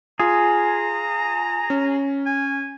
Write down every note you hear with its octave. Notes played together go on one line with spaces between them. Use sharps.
F4 G#4 A#5
C#4
G#5